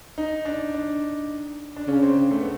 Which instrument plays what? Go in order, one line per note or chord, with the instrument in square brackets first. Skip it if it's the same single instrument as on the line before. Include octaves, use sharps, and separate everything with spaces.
[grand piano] D#4
D4
D4
D4
[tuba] C#3 [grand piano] C#4
[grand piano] C4
A3
B3